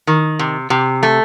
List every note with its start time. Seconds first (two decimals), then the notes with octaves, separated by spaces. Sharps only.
0.07 D#3
0.39 C3
0.70 C3
1.03 A3